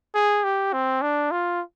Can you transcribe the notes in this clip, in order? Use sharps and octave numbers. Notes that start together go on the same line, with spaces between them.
G#4
G4
C4
D4
F4